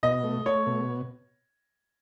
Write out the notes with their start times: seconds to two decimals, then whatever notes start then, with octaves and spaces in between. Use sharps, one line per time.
0.03 B2 D#5
0.24 A3
0.46 A3 C#5
0.67 B2